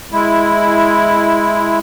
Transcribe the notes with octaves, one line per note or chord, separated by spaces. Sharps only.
G#3 E4